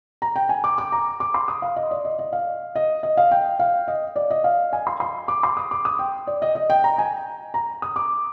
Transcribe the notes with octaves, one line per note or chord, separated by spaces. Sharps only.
A#5
G5
G#5
D6
D6
A#5
D6
C6
D#6
F5
D#5
D5
D#5
D#5
F5
D#5
D#5
F5
G5
F5
D#5
D5
D#5
F5
G#5
C6
C6
D6
C6
D#6
D6
D#6
G5
D5
D#5
D#5
G5
A#5
G#5
A#5
D#6
D6